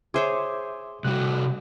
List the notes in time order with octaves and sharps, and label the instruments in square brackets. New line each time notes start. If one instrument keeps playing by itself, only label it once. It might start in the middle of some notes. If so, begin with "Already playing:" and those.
[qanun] G#4 C5 C#5 [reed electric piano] E5 C6 D6
[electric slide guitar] C3 G3 F#4 [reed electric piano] F#6